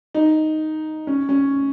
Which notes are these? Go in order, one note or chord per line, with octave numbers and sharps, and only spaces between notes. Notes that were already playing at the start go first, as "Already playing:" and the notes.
D#4
C#4
C#4